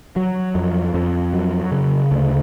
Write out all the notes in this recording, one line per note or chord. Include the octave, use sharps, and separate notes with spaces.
F#3
F2
F2
F#3
C#3
D2